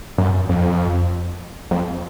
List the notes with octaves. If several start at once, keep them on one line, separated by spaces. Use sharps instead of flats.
F#2
F2
F2